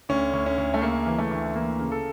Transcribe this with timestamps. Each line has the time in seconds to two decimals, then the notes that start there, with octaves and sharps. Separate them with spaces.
0.09 D2 C#4
0.33 D2
0.46 C#4
0.58 D2
0.74 A3
0.82 C#3 A#3
1.06 E3
1.19 A3
1.31 D2
1.56 E3 A#3
1.80 C#3
1.92 A4